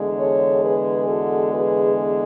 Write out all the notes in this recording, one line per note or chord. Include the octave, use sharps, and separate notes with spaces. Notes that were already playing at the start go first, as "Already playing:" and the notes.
Already playing: E2 D3 G#3
A4 C#5
G#4 B4
F#4 A4
G#4 B4